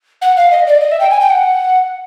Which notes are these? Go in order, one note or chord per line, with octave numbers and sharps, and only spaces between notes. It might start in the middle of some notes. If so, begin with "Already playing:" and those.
F#5
F5
D#5
D5
D#5
E5
G5
G#5
G5
F#5